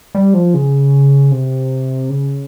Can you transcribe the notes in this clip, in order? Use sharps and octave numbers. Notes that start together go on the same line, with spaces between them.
G3
F3
C#3
C3
C#3